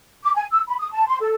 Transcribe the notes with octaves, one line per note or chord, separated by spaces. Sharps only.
D6
G#5
E6
B5
D#6
A5
C6
A4